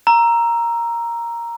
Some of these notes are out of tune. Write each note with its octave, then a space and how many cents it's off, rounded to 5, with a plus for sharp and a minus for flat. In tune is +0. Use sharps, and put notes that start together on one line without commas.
A#5 +0 E6 +15